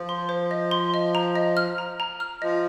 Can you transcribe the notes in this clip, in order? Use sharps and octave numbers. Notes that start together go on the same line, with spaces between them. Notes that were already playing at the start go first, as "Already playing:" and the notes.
Already playing: F3
C6
C5
D#5
C6
D#5
A#5
D#5
F6
A#5
A#5
F6
F3 D#5